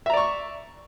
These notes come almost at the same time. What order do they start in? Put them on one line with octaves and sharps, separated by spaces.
E5 A#5 D5 C#6